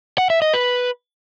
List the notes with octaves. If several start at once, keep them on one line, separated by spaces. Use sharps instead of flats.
F#5
E5
D#5
B4